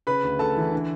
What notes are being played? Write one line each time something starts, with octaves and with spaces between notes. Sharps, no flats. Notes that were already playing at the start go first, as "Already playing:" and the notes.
C#3 B4 B5
D2
D2 A4 A5
E3
D3